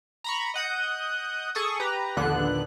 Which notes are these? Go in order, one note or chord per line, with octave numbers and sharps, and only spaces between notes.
A#5 B5 C#6
D#5 F#5 D#6 G6
G#4 A4 C#6 D#6
G4 B4 A#5
A#1 D#2 D3 B3 D4 F#6